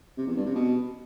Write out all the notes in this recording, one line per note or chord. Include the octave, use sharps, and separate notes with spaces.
C3
E2
G2
C3
B2